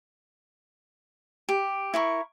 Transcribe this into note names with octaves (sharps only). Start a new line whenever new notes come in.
G4
E4 A#4 C#6